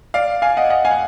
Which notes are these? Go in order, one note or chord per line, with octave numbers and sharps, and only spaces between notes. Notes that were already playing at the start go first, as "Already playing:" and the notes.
D5 F5
F5 G#5
D#5 F#5
D#5 F#5
F5 G#5
F#5